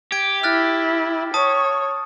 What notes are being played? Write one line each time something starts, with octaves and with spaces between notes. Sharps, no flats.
G4 G#6 D7
E4 F6 F#6 A6
C#5 A5 D#6